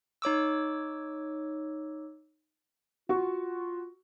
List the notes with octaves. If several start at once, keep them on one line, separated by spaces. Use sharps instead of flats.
D#4 C#5 D6 E6
F4 F#4 C#6